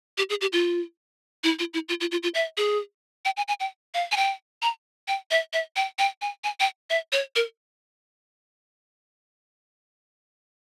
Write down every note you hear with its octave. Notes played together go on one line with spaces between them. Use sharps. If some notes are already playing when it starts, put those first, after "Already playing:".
G4
G#4
G4
F4
E4
F4
E4
F4
F4
F4
F4
E5
G#4
G5
G#5
G#5
G5
F5
G#5
G5
A#5
G5
E5
E5
G5
G5
G#5
G#5
G5
E5
C#5
A#4